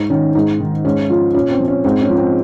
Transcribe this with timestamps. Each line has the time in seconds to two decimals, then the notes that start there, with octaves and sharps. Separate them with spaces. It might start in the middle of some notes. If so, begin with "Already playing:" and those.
Already playing: G#2 D#4
0.10 D#3 C#4
0.35 G#2 D#4
0.60 D#3
0.85 G#2 C#4
1.09 F3 F4
1.34 A#2 C#4
1.51 C4
1.60 F3
1.68 C#4
1.84 G#2 C4
2.02 C#4
2.09 F3
2.18 C4